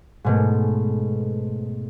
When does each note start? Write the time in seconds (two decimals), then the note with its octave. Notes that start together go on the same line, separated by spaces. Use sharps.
0.24 G#2 B2 A3